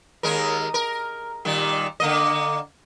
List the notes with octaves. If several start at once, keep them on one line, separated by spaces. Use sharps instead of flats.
D#2 G#3 A#4
A#4
A#2 D#3 G3
D3 A#3 D#5